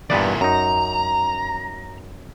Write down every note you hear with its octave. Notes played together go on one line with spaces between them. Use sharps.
E2 G2 A#2 B3 D5
F#2 D#4 A#5